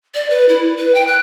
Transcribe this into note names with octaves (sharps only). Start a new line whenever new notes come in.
D5
B4
E4
B4
G5
F#6